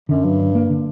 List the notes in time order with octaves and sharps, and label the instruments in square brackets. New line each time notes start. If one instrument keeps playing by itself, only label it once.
[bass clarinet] F#2 [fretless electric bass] D3
[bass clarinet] G2 [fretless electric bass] F#3
[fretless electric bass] D4
A#3
D3